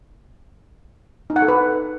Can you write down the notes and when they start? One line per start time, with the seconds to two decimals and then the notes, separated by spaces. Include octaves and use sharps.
1.30 D#4
1.36 F#5
1.42 A4
1.48 B4